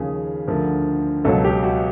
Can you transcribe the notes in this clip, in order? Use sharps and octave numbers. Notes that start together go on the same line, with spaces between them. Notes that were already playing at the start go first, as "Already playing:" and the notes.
Already playing: D#2 C#3 F3 G#4
D2 D3 F3 A#4
C#2 B2 F#3 A4
G4
F#4